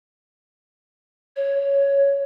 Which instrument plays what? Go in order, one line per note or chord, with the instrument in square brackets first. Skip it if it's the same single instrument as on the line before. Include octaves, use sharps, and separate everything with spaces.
[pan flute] C#5